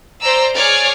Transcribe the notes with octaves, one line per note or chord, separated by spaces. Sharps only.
C5 D5 A#5 E6
G#4 C#5 D5 F6